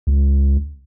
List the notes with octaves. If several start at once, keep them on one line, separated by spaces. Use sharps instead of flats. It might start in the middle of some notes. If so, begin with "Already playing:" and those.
C#2